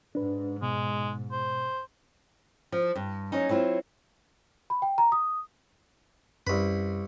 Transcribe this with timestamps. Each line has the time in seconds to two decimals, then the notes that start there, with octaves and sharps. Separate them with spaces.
0.15 G#2 D4 B4
0.62 B2 G#3
1.31 C5
2.72 F3
2.95 G2
3.32 F#3 A#3 C#4 D#4
3.49 F#3 C4 E4 F4
4.70 B5
4.82 G5
4.98 A#5
5.12 D#6
6.47 C2 F#2 B4